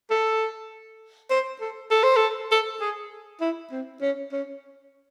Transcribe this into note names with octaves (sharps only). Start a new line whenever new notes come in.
A4
C5
A4
A4
C5
A4
A4
G#4
E4
C4
C#4
C#4